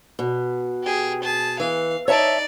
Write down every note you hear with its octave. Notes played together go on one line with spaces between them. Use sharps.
B2
G4 G#4
G#4 A5
E3 F5
D#4 C#5 D5 E5 A5